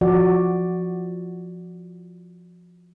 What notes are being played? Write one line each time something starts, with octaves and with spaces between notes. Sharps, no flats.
F3 F#4 D5